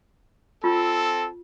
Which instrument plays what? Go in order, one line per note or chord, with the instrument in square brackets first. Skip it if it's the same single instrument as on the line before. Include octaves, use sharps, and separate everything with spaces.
[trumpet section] C4 A4 [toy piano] F4